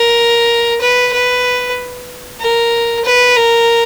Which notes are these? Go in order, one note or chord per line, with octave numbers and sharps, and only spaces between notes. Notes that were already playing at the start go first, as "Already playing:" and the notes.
Already playing: A#4
B4
B4
A#4
B4
A#4